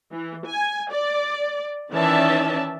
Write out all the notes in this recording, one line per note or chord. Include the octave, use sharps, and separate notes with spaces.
E3
G#5
D5
D#3 E3 C#4 D5 E5 A5